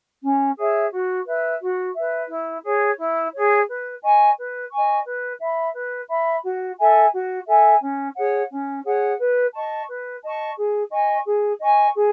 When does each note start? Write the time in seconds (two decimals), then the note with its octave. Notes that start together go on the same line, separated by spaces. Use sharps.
0.23 C#4
0.57 G#4 C#5 E5
0.92 F#4
1.26 B4 E5
1.61 F#4
1.94 B4 E5
2.29 E4
2.64 G#4 C#5
2.98 E4
3.33 G#4 C#5
3.68 B4
4.02 D#5 G#5 C#6
4.37 B4
4.70 D#5 G#5 C#6
5.06 B4
5.40 E5 B5
5.74 B4
6.08 E5 B5
6.44 F#4
6.78 A4 E5 G#5
7.13 F#4
7.47 A4 E5 G#5
7.81 C#4
8.16 G#4 C#5 F#5
8.51 C#4
8.85 G#4 C#5 F#5
9.19 B4
9.54 D#5 A5 C#6
9.89 B4
10.23 D#5 A5 C#6
10.57 G#4
10.91 D#5 G#5 C#6
11.26 G#4
11.60 D#5 G#5 C#6
11.96 G#4